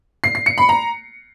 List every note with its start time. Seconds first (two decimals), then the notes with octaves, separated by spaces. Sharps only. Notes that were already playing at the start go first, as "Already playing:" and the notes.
0.24 C7
0.35 C7
0.46 C#7
0.58 B5
0.69 A#5